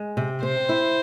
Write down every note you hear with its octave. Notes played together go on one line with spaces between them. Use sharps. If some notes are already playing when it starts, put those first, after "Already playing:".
Already playing: G#3
C3
C4 C5
E4